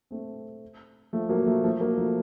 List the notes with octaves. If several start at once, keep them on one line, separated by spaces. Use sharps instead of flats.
A3 C4
F3 A3
F#3 A#3
F3 A3
F3 A3
F#3 A#3
F3 A3